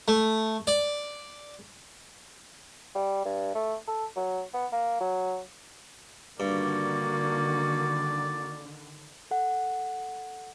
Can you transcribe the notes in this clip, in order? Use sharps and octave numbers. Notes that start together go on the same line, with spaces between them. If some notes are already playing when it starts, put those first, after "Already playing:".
A3
D5
G3
G2
A3
A4
F#3
B3
A#3
F#3
G2 D3 D#3 A#3 F#4 D5
A4 F#5